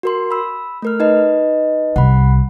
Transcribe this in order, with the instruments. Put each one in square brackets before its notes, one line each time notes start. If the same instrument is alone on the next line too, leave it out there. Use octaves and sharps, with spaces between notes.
[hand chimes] F#4 A#4 C6
B5 E6
A3 A#4 F6
D#4 B4 D#5
[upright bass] C2 [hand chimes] F#5 B5